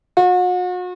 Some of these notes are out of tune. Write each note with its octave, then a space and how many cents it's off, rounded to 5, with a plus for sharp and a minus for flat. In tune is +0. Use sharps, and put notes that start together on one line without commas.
F#4 -40